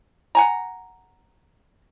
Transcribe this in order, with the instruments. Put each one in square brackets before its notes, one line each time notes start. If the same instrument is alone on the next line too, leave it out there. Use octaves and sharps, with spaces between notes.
[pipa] F#5 G#5 A#5